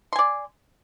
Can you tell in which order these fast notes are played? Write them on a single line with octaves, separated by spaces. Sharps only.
C6 G#5 D5